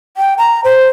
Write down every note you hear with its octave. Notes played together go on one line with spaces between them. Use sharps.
G5
A#5
C5